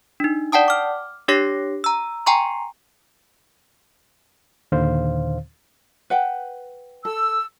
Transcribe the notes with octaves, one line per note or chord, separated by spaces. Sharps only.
D4 D#4
D5 F#5 G5 A5 D#6
D6 F6
D4 G4 C#5 D6 A#6 C7
A#5 E6
G5 G#5 A#5 C6 C#6
D#2 A#2 D3 D#3 C5 F5
B4 F#5 G5
A4 E6